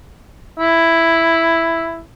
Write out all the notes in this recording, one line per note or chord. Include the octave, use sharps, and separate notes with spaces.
E4